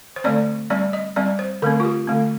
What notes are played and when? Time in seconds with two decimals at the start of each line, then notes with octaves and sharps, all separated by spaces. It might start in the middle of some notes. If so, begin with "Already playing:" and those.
0.16 C5
0.24 D3 A3 C4 D5
0.70 G3 C4 D5
0.93 D#5
1.16 G3 C4 D5
1.39 C5
1.62 D3 A3 C4 A#4
1.80 F4
1.85 G4
2.07 D3 A3 C4